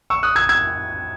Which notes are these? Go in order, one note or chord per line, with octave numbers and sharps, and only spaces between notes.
C#6 E6
D#6 F#6
E6 G#6
E6 G#6